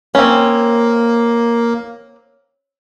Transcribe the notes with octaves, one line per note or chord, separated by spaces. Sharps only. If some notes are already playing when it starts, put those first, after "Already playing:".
A#3 C4 C#4